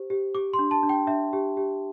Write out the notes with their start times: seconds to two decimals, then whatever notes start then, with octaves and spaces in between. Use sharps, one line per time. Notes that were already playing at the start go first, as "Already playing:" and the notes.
Already playing: G4 C5
0.10 G4
0.35 G4 D6
0.53 C6
0.59 D4
0.71 A5
0.83 D4
0.89 G5
1.07 D4 E5
1.33 G4
1.57 G4